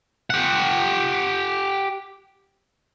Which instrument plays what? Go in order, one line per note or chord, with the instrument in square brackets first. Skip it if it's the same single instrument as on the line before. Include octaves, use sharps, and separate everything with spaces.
[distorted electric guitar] G4 F#5